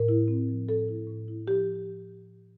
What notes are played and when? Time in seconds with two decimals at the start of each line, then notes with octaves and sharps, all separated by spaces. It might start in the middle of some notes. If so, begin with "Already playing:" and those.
Already playing: A2 A#4
0.09 E4
0.28 C4
0.49 F3
0.69 A2 A4
0.88 E4
1.07 A2
1.28 E4
1.47 F3 G4